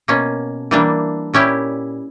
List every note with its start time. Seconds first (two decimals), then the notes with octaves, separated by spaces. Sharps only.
0.08 B2 A#3 C#4
0.71 E3 G3 A#3 D4
1.34 A#2 G3 C#4 E4 G4